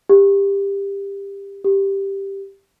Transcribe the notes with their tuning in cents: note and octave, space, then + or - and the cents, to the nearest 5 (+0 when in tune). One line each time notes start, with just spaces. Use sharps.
G4 +20
G4 +5